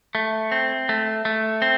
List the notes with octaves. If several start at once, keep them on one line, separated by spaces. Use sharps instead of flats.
A3
C4
A3
A3
C4